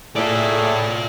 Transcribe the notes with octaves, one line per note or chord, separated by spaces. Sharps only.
A2 F4 G#4 D5 E5